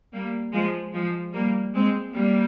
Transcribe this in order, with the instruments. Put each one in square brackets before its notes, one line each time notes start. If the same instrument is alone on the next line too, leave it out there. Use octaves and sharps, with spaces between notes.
[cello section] G3 A#3
F3 G#3
F3 G#3
G3 A#3
G#3 C4
G3 A#3